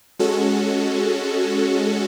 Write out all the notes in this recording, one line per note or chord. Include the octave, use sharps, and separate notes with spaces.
G#3 C#4 F#4 A4